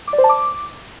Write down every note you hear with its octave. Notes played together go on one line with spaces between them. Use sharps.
D6
D5
C5
A5
D6